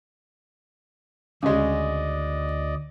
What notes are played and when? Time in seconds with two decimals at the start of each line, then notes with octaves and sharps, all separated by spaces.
1.43 D2 C#3 G#3 D5 D#5